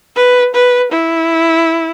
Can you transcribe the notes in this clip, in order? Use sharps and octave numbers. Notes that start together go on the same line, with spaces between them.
B4
B4
E4